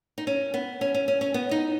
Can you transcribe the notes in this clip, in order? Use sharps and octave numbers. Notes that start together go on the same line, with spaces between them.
D#4
C#4
B3
C#4
C#4
C#4
C#4
B3
D#4